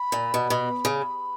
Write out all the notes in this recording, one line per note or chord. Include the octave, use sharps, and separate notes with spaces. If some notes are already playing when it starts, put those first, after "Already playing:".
Already playing: B5
A#2
B2
B2
C#3